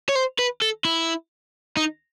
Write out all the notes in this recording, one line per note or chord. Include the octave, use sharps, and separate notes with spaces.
C#5
C5
B4
A4
E4
D#4